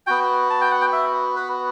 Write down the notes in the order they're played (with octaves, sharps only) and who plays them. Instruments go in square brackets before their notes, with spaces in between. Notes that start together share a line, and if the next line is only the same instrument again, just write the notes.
[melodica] B3 F#4 G5
A5
G5
F#5
G5
E5
B4